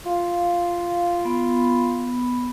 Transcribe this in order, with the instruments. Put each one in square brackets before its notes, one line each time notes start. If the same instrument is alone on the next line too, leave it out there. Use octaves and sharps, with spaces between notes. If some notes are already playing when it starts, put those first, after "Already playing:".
[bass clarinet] F4 [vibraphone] F5
[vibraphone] B3 B5